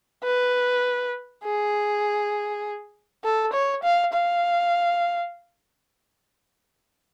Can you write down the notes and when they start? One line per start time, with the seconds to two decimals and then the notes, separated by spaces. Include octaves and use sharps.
0.24 B4
1.44 G#4
3.24 A4
3.53 C#5
3.83 F5
4.13 F5